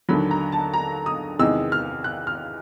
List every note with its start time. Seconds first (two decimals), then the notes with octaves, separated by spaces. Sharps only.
0.09 D#2 D3 F#3 B5
0.31 A#5
0.52 A5
0.74 A#5
1.06 D#6
1.39 E2 C3 D#3 G#3 E6
1.72 F6
2.04 F#6
2.27 F6